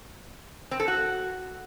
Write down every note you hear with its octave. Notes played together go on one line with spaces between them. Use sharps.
C4
A4
F#4